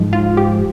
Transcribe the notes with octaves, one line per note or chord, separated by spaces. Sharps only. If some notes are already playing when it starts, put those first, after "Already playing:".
Already playing: G#2 F3 G#3
F4
G4